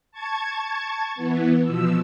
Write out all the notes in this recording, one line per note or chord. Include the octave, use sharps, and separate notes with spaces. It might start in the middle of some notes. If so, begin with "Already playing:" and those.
A5 C#6 G#6
E3 B3
B2 F3 E6